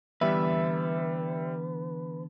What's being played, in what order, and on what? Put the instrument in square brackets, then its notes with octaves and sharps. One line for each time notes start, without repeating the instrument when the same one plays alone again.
[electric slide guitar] D3 E3 B3 [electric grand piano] G3 E5 [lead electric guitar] B4